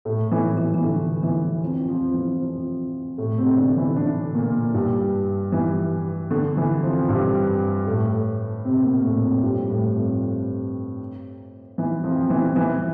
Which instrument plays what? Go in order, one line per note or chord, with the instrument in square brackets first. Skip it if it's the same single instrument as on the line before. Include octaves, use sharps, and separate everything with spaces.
[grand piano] A2 A3
E3
E3
E3
D3
E3
F2 F3
F2 F3
E3
F2 F3
A2 A3
C3 C4
D3 D4
E3 E4
D3 D4
A#2 A#3
G2 G3
E3
D3
E3
F2 F3
G2 G3
A2 A3
C3 C4
A#2 A#3
A2 A3
F2 F3
G2 G3
A2 A3
F2 F3
E3
F2 F3
E3
E3